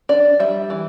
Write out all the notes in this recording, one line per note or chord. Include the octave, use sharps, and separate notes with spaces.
D4 D5
G3 E5
E3